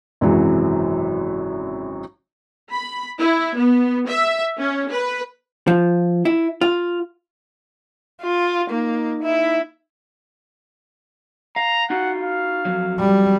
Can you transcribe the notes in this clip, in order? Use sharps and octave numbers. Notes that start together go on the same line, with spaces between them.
G#1 F#2 C3 E3 F#3 G#3
B5
E4
B3
E5
C#4
B4
F3
E4
F4
F4
A#3 D#4
E4
F5 A#5
D#4 F4 F#4 F#5
F5
F2 G#2 F#3
G3